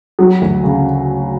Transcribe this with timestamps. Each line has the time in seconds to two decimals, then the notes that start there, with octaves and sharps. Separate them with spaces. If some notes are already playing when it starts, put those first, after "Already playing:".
0.19 F#3
0.41 D2
0.63 C#3